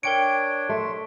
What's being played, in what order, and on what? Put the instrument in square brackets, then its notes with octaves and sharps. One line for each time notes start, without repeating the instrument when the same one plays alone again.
[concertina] D4 C#5 [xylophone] A#4 G5 C#7 [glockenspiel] D7
[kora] A3 [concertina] C6